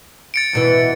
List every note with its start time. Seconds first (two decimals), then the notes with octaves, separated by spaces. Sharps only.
0.34 A6 C#7 D7
0.53 E2 B2 E3